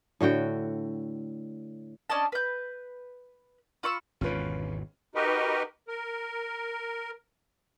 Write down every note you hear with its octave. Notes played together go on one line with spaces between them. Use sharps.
A2 D3 F#4 G5
C#4 D4 D#5 A5
B4 G6
F4 B5 C#6 E6
G#1 E2 B2 C#4 F4 B4
D#4 F#4 G4 A#4 B4 D#5
A#4